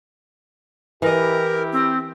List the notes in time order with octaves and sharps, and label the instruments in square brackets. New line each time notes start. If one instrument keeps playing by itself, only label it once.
[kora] E3 D#5 [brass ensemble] E4 G4 [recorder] A#4
[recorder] C4